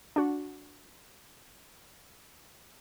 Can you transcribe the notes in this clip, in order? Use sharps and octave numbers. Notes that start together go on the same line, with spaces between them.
D4 F#4